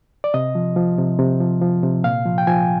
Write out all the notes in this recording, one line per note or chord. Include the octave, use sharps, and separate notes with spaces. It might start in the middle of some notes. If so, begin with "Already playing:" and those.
D5
C3 D#5
F3
F3
C3
C3
F3
F3
C3
A#2 F5
F3
G5
F3 G#5